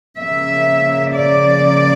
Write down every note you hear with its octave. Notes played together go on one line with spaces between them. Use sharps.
C#3 F3 A#3 E5
D5